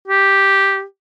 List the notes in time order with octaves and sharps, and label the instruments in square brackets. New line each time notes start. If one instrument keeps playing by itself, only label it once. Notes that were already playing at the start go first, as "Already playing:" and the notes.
[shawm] G4